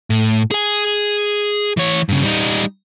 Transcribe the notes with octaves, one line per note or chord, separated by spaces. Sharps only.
A2
G#4 G#5
E3 C#5
G2 C#3
G3 D#4